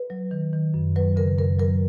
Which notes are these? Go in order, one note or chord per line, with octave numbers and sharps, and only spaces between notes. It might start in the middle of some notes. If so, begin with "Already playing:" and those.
Already playing: B4
F#3
D#3
D#3
F#2
F#3 B4
C#3 A#4
F#2 A#4
F#3 A#4